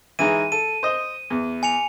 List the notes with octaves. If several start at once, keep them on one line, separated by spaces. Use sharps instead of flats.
E3 G#3 D#4 D#7
A4 D#7
C5 D#5
E2
G#5 C#7 F7